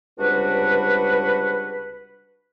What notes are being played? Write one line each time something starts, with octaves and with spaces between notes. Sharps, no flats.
C#2 C3 G3 D4 F#4 B4